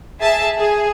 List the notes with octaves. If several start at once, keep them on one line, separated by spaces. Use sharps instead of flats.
G#4 E5 A5
G#4